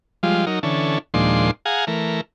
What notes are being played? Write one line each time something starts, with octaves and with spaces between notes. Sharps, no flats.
F3 G3 G#3 F4
F#3 D#4 A#4
D3 E3 C#4 A4
D#2 A#2 F3 G#3 D4 C6
G#4 F5 F#5 G#5 A#5
E3 A3 A#4